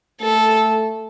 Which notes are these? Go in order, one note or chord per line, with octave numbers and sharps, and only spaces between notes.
A3 A4